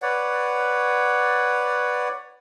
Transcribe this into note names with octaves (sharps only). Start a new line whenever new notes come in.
B4 C#5 D5 F#5